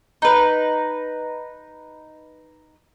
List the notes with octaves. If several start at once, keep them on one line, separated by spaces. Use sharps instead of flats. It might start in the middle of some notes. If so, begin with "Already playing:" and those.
D#4 B4